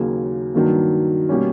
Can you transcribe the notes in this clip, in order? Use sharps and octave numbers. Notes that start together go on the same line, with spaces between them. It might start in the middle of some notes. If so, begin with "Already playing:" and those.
Already playing: D#2 C#3 F#3 A#3
G2 D#3 F#3 A#3
B2 G3 A#3 C#4